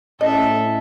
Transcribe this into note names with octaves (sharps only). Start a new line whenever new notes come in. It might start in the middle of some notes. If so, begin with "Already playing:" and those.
A2 C#4 A4 D#5 E5